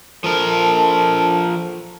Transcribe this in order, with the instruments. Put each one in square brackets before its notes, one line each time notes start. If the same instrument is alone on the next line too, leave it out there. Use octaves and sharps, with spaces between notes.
[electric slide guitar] F3 A#4 [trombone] A4